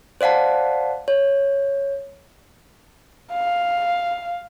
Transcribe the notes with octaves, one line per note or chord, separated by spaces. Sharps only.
C5 D5 F5 F#5 A5
C#5
F5